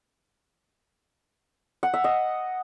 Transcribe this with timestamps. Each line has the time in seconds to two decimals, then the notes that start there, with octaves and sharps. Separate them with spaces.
1.83 F#5
1.94 E5
2.04 D#5